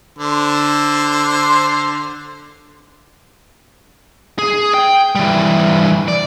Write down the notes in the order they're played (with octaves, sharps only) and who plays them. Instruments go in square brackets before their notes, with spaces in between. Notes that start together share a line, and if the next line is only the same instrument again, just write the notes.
[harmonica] D3 C5
[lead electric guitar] G#4
G5
E3 G3
D5